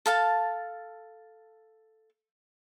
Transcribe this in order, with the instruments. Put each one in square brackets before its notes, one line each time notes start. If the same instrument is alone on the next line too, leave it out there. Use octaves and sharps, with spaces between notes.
[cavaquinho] A4 F5 A5